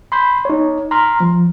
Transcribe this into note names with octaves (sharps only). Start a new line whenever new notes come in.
B5 C6 G6
D#4 C#5
A#5 C6 F6
F3